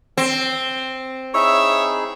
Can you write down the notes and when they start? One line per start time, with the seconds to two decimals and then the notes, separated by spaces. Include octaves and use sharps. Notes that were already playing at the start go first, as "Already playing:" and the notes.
0.18 C4
1.34 D#4 E4 G#4 C#5 E5